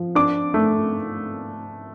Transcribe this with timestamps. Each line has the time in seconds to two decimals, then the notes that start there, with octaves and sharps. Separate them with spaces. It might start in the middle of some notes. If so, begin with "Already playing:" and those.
Already playing: F3
0.15 D4 D6
0.54 A3